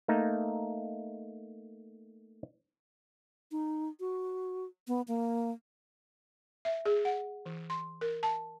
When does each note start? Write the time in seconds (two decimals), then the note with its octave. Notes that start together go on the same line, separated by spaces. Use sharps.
0.08 A3 A#3 D#4
3.52 D#4
4.00 F#4
4.88 B3
5.08 A#3
6.65 E5
6.85 G#4
7.05 F#5
7.46 E3
7.70 C6
8.01 A#4
8.23 A5